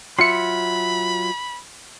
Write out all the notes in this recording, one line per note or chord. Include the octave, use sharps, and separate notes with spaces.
F#3 F4 E5 B5 C6 C#7